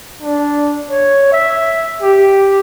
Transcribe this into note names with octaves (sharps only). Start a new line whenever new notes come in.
D4
C#5
E5
G4